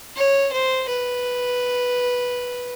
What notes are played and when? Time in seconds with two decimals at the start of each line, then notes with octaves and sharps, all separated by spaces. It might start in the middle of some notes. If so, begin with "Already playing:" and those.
0.16 C#5
0.53 C5
0.89 B4